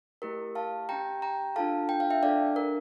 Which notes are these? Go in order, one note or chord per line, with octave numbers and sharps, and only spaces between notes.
A3 E4 G4 A#4
F5 A5
C#4 G4 G5 A#5
G5 A#5
D4 F4 A4 F5 A5
G5
F5
E5 G5
D4 A4 D5 F5
A#4